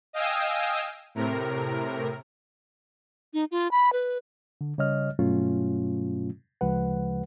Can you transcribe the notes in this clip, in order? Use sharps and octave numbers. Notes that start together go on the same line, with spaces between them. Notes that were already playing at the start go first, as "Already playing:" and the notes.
D#5 F5 G5 G#5 D#6 E6
A2 C3 A#4
D#4
F4
B5
B4
D3
C#3 G3 C#5 D#5 F6
G2 B2 F#3 A3 C#4 F4
D2 C#3 F3 G#3 B4 F#5